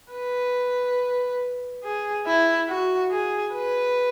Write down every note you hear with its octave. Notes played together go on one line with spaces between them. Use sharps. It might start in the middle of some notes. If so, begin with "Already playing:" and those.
B4
G#4
E4
F#4
G#4
B4